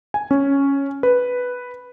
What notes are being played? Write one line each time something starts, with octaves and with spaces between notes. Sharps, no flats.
G#5
C#4
B4